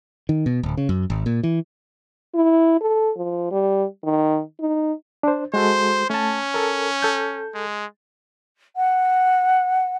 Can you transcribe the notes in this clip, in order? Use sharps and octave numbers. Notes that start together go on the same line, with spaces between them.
D#3
B2
D1
C#3
F#2
G#1
A#2
E3
E4
A4
F3
G3
D#3
D#4
D4 C5
G#3 F#4 A4 C5
A3 C#4 A5
A4 A#4
A4 G6
G#3
F#5